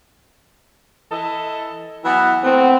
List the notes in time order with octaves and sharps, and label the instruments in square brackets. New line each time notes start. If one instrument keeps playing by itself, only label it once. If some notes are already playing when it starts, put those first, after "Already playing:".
[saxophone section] E3 A4 D#5
E3 F#3 B3
[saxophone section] A3 B3 [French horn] C4